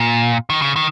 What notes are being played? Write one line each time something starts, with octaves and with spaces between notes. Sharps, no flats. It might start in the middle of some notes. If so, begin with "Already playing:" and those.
Already playing: A#2
D#3
C#3
D#3